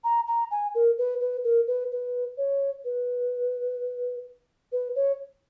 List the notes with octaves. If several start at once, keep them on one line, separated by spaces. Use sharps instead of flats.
A#5
A#5
G#5
A#4
B4
B4
A#4
B4
B4
C#5
B4
B4
C#5